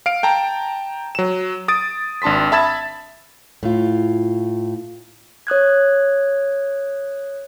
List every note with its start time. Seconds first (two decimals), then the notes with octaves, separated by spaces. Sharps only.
0.06 F5 D7
0.23 G5 A5 A#5
1.15 F#3 E7
1.68 D#6 A6 D7
2.22 G#1 D4 A5 C6 B6
2.52 E5 A5 B5 G#6 A6 E7
3.63 A2 F4
5.47 C#5 D#6 F#6 G#6